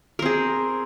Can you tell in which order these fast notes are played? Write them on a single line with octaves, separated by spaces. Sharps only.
A#4 C4 G#4